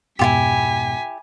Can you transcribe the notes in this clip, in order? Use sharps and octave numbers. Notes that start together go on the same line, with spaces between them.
F2 G#2 B2 E4 F4 G4 G#5 B6